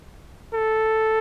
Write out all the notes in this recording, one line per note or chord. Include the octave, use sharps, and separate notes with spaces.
A4